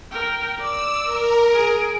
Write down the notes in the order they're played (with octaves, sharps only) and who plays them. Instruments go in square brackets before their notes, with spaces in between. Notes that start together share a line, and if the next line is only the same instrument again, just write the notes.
[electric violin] A#4 G5
[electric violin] D5 [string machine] E6
[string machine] A#4
[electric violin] G#4 D7